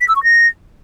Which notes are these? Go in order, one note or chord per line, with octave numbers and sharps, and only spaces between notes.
B6
E6
C#6
A#6